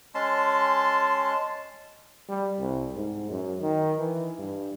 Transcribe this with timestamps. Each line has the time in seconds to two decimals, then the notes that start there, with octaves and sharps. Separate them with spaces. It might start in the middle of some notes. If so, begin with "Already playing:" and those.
0.15 G#3 C#4 A5 C6
2.29 G3
2.60 C2
2.96 G#2
3.30 F#2
3.61 D#3
3.99 E3
4.39 G2